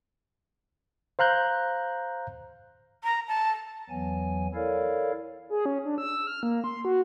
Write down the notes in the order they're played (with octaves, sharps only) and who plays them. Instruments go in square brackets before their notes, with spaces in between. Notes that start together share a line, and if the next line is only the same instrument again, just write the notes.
[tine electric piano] C5 F5 A#5 F#6 G6
[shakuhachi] A#5
A5
[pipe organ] E2 E3 F#3 B3 G#5
E4 A4 A#4 C#5 D5 F5
[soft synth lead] G#4
C#4
D4
E6
F6
A#3
C6
F#4